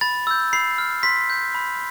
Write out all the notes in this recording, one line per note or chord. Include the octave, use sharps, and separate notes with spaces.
B5 A6
E6 G6
B5 C7
F6
C6 B6
G6
B5